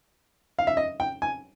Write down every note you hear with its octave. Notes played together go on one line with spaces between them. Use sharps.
F5
E5
D#5
G5
G#5